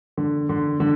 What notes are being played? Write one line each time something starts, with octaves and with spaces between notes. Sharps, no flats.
D3
D3
D3